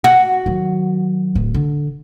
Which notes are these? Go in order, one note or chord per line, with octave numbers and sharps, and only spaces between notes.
F#4
D#3 F#3
D1
D3